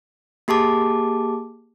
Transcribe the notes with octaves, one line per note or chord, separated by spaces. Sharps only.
A#3 G4 G#4 A5 D6